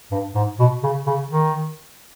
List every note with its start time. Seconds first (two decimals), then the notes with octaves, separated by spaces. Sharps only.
0.11 G2
0.35 G#2
0.59 B2
0.83 C#3
1.06 C#3
1.31 D#3